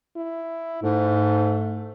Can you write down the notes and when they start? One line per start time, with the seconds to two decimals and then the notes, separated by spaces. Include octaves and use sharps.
0.16 E4
0.83 G#2 A3